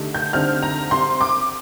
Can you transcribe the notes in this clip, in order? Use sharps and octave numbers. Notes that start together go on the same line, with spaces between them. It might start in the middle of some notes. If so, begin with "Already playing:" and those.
Already playing: D3 A3 D#4 G4
G6
D3 G3 C4 D#4 F6
A#5
G3 C4 G4 C5 C6
D6